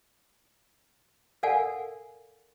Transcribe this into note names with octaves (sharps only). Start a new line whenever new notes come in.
A4 A#4 D5 F5 F#5 G#5